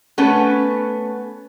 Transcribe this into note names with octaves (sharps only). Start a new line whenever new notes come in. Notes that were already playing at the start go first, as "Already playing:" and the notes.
A3 B3 C#4 B4